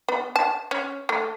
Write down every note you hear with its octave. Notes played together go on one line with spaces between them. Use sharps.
B3
A5
C#4
A3